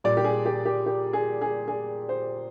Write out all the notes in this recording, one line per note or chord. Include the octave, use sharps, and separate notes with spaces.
A#2 G3 D5
G4
G#4
G4
G4
G4
G#4
G#4
G#4
C5